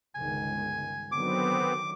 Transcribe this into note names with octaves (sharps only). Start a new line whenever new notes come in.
G1 C#2 D#3 G#5
D3 D#3 F#3 B3 C4 D6